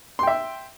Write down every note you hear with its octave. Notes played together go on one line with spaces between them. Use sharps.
E5 G5 C6